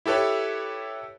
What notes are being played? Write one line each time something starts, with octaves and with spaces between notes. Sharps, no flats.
E4 G4 A4 B4 C#5